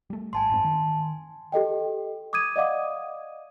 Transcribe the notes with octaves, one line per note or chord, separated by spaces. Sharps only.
G3 A3
G#1 G#5 A5 C6
F#1 G#2 C4
D#3
G4 A4 D#5 G5
D6 D#6 G#6 D#7
D5 D#5 F5 F#5 D6 D#6